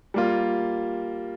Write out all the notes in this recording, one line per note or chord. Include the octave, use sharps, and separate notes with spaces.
G3 A#3 F4